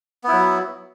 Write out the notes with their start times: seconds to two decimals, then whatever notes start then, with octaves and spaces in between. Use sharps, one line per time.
0.24 B3
0.28 E4
0.32 F#3